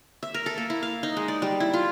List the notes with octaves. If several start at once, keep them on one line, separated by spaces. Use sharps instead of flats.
E5
A#4
A4
A#3
E4
F5
D#4
G#3
D5
G3
E4
F4